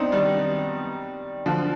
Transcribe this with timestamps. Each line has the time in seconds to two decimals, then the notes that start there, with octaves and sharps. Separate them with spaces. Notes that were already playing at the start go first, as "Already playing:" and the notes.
Already playing: B3 C4 D4 D#4
0.12 D#3 G3
1.46 D3 F3